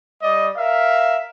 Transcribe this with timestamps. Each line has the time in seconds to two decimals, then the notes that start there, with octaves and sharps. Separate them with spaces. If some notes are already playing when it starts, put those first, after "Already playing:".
0.22 G3 D5 D#5
0.56 A#4 E5 F5